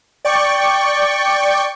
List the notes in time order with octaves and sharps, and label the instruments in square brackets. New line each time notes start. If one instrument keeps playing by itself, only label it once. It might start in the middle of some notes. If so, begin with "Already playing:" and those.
[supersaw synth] D5 G5 C#6